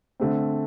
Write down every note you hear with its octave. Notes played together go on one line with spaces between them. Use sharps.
D3 A3 C4